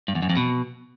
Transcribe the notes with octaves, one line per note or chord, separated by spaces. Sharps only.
G2
E2
F#2
F2
B2